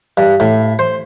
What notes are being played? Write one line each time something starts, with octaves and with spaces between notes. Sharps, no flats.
G2
A2
C5